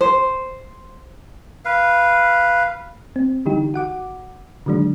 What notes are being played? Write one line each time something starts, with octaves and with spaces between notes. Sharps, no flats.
C5
B4 F5
C4
D3 E3 G3 D#4 G4
F#4 F#5 D6
D3 D#3 F#3 G#3 D4